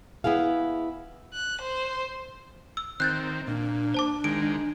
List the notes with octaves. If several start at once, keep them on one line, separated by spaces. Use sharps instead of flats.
B3 E4 G#4 F5
F#6
C5
E6
D#3 C4 F#6 G6 A6
A#2 D4
C5 A5 D6
D#3 G#3 D7